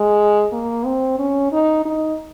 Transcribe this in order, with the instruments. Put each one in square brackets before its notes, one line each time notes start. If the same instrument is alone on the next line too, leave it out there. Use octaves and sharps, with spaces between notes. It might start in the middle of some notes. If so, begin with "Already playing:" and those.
Already playing: [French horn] G#3
A#3
C4
C#4
D#4
D#4